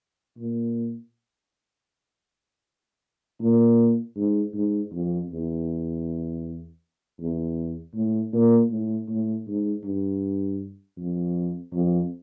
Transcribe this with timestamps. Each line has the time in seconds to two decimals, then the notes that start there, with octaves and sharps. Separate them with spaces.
0.38 A#2
3.40 A#2
4.16 G#2
4.54 G#2
4.92 F2
5.30 E2
7.19 E2
7.94 A2
8.33 A#2
8.70 A2
9.08 A2
9.47 G#2
9.84 G2
10.98 F2
11.73 F2